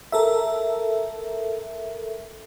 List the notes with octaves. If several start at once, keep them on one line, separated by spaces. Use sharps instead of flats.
A4 A#4 E5